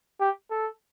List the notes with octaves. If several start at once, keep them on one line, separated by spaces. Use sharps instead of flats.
G4
A4